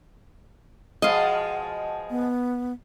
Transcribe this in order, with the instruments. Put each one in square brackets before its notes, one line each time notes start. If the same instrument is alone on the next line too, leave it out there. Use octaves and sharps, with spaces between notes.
[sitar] B2 F3 G#3 [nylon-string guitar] D#5 F5
[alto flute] B3